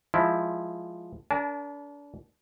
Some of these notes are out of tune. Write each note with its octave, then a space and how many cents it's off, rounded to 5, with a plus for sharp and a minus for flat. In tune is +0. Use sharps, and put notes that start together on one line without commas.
F3 +0 G#3 +0 E4 +0
D4 -35 A#4 +0 A5 -45